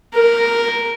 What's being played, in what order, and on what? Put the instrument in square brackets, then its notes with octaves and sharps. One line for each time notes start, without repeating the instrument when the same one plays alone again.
[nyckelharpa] A#4